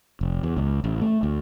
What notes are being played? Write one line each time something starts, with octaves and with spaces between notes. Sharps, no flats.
F1
E2
C#2
A1
A3
D2